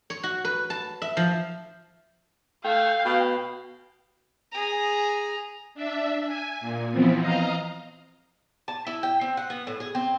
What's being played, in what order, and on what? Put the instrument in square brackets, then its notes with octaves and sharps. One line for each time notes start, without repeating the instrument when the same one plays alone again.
[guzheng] C#5
F#4
B4
A5
E5
F3
[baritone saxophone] A3 [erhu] F5 [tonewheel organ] G5
[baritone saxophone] B2
[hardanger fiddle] G#4 A#5
[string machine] D4 E5
G#5
A#2
E3 F3 B3 C4
D#5 F5 A#5
[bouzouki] A5
E4
G5
C4
F#5
B3
A2
G#4
C4